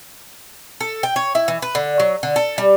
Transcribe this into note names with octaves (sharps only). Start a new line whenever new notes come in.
A4
G5
C#5
E4
E3
B4
D3
F#3
D3
A4
G3